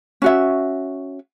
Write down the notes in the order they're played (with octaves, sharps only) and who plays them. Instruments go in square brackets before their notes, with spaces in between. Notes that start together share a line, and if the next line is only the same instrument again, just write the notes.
[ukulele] C#4 F#4 E5